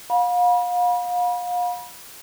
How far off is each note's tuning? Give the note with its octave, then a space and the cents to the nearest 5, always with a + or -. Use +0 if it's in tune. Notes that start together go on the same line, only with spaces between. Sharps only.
F5 +35 B5 -35